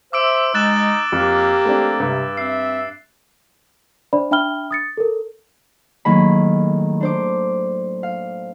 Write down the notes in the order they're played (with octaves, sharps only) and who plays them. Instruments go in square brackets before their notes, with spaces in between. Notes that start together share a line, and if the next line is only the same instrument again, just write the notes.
[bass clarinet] C5 [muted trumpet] E5 [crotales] D6 E6 D7
[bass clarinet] G#3 [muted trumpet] D#4 [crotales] F#6 A6 E7
[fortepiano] F2 [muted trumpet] A#3 [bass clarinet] G4
[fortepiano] A3 C4 D4
[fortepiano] G2 [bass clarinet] C3
[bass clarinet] C4 [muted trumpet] E5 [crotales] C7
[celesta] D4 C5 D5 E5 B5
D4 E5 G5 B5 F6 G7
D#6 A6 C#7
A4 A#4
[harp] A2 D#3 F#3 A#3 G#4 B5
D4 C5 D6
F5